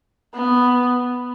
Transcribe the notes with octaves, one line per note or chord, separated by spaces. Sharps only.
B3